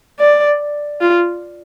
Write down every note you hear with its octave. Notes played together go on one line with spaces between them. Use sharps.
D5
F4